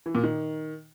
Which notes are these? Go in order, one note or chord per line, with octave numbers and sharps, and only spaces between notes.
E3
A#2
D#3